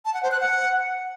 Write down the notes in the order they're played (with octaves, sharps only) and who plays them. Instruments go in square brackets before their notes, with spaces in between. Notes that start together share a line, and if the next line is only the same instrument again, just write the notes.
[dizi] A5
F#5
C5
F#6
F#5